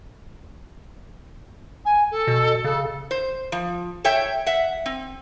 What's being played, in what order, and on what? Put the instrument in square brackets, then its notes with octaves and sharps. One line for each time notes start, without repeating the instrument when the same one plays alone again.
[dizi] G#5
A4
[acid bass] B2
[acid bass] C#3 [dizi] A4
[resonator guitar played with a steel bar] C5
F3
A4 C#5 E5 G5
E5 F#5
C4